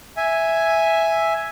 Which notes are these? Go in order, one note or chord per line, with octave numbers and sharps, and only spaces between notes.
E5 G#5